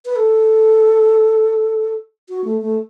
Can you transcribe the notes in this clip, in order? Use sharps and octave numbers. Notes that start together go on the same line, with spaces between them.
B4
A4
F#4
A3
A3